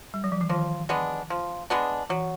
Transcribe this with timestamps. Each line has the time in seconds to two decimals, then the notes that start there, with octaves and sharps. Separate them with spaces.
0.14 G3
0.24 F#3
0.32 F3
0.41 E3
0.49 D#3 F3
0.89 G#3 B3 D4
1.30 F3
1.70 G#3 B3 D4
2.10 E3 F#3